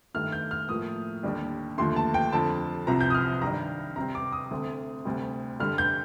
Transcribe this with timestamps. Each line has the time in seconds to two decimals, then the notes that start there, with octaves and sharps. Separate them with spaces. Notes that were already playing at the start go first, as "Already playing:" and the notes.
0.14 G2 D#3 A3 F6
0.32 G6
0.51 F6
0.69 A2 F3 A#3 D#6
1.23 D#2 D3 G3 D4
1.78 D#2 D3 F3 A3 C6
1.96 A5
2.14 G5
2.33 F2 D3 F3 A5
2.87 C2 C3 F3 A#5
3.01 G6
3.10 D#6
3.15 F6
3.41 G2 D#3 G3 D4 A#5
3.96 C3 G3 C4 A#5
4.15 D6
4.32 D#6
4.51 D2 D3 A3 C4
5.05 D2 C3 G3
5.59 G2 D3 G3 F6
5.78 G6